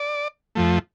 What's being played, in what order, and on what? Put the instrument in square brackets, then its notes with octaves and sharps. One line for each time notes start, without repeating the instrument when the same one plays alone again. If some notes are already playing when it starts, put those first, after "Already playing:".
Already playing: [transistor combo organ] D5
F2 F3 A3